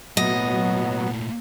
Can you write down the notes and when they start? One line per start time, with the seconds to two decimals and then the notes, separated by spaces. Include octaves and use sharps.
0.17 A#2 F#3 A3 B3 D#5